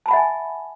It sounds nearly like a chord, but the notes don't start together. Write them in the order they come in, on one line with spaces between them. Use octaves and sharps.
A5 B5 F#5 E5 G#5